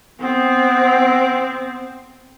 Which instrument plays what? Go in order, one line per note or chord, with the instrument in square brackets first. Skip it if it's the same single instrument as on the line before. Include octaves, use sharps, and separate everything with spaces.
[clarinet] B3 [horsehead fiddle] C4